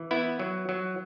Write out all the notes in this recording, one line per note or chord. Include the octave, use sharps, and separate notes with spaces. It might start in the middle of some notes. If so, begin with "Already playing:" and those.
Already playing: E3
B3 E4
F#3
F#3